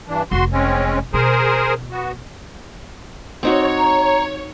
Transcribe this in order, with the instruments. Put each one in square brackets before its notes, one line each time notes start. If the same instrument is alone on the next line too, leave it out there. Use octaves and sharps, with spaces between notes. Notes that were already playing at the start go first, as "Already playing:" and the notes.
[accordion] G2 E3 D4
[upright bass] F1 [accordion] F#4 C6
[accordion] G#3 C4 C#4
[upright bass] B2 [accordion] G#4 A#4 C5
[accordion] B3 F#4
[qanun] C4 D#4 F#4 [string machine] C#5
[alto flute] A#5